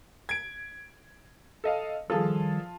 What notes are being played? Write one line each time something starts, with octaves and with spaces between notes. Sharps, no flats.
G#6 D7
A4 D#5 F5
D#3 F3 G3 F4 G#4 A4 A5